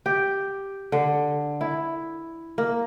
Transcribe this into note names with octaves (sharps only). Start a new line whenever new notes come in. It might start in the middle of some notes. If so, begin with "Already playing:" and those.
G4
D3
E4
A#3